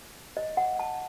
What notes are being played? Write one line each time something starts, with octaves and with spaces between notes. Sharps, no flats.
D#5
F#5
A5